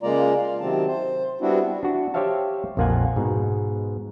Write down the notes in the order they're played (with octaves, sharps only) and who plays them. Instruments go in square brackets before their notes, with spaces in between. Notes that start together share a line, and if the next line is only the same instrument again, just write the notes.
[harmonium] C#3 G#3 A#3 F4 D5 A#5
F4
C3 D#3 F#3 C4 A5
C5
G3 B3 C4 D4 E4 F#4
[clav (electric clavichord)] D4 F#4
G4 C5 C#5 E5 F5 A5
A#1 F2 A#3 F4 F#5 G#5
G#2 B2